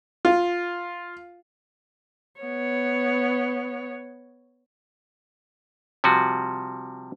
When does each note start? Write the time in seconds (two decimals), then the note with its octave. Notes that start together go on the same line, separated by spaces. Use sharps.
0.25 F4
2.41 B3 C#5
6.04 C3 F3 G3 F#4